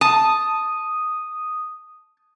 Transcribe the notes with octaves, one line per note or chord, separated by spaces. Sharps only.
A5 D#6